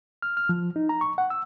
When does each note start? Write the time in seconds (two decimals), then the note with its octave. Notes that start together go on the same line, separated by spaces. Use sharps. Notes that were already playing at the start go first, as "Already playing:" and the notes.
0.22 F6
0.37 F6
0.49 F3
0.76 D#4
0.89 A#5
1.01 C#6
1.18 F#5
1.30 E6